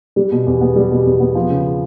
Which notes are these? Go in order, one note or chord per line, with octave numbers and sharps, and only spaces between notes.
G3
B2
E2
B3
G3
B2
E2
B3
F3
C#3